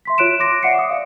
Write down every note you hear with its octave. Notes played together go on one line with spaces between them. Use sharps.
E5 C6 B6
F4 C#5 F#6 D7 E7
C6 D6 A#6 D7
D5 E5 F#5 C#6 C7 C#7
D6 D#6
D5 E5 F5